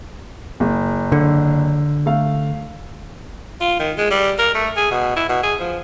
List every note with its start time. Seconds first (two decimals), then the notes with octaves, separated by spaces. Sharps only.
0.60 F#1
1.12 D3
2.06 A3 F5
3.61 F4
3.79 D#3
3.98 G#3
4.11 G3
4.39 A#4
4.55 A3
4.77 G#4
4.91 B2
5.16 E4
5.29 B2
5.43 G#4
5.60 F3